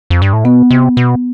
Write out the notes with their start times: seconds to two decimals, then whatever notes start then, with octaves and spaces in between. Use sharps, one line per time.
0.10 F2
0.22 G2
0.33 A2
0.44 B2 B3
0.71 C3
0.97 B2